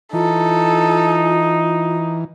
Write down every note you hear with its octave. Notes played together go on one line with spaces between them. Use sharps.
E3 D#4 F4 A4